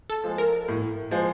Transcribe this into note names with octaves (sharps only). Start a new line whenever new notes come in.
A4
F3 G#3
A#4
A2
F3 G#3